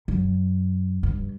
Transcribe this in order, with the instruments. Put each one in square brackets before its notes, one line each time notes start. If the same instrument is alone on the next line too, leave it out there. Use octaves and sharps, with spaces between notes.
[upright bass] F#2
G2